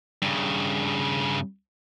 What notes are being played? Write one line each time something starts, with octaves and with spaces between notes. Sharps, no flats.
G2 C#3